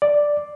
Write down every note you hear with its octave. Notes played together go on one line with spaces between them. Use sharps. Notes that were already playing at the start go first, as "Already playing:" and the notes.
D5